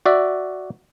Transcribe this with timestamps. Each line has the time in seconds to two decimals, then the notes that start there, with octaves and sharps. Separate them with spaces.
0.06 F#4 D5 E5